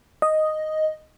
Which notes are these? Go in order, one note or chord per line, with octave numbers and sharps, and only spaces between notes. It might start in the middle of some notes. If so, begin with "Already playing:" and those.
D#5